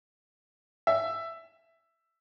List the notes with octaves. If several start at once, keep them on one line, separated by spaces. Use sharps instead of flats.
E5